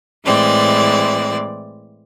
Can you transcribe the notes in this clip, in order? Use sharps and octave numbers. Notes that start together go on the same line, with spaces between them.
A2 E3 G#3 C4 D5